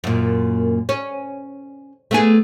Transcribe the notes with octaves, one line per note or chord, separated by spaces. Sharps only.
F#2 A#2
C#4
A3 B3 G#4